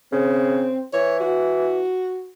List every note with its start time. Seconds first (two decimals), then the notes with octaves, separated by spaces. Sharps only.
0.12 C#3 C4
0.93 E3 C#5
1.20 F#4